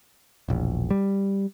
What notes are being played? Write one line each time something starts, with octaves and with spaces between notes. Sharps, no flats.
E1 A#1
G3